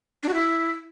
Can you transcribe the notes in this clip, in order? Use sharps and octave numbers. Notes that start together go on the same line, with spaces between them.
D4
F#4
E4